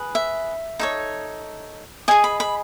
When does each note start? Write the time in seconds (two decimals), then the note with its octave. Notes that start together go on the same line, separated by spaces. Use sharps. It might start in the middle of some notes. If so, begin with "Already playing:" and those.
Already playing: G#4 B4
0.15 E5
0.79 D#4 A4 C#5
2.08 G#4 D#5 G#5
2.24 B5
2.40 B5